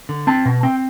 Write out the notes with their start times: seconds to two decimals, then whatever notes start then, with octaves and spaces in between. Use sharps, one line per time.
0.09 D3
0.27 C4 A5
0.45 B2
0.63 C4 G5